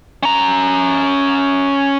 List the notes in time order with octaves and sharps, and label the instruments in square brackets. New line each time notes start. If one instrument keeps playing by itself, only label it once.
[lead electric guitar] C#4 A#5